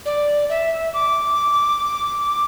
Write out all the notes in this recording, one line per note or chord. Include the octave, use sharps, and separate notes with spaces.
D5
E5
D6